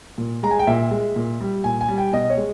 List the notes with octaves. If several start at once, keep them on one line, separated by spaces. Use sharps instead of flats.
A#2
G#3 A#5
G#5
G5
A#2 E5
G#3
A#2
G3
A#2 G#5
G#5
G3
G5
B2 D#5
C#5
G#3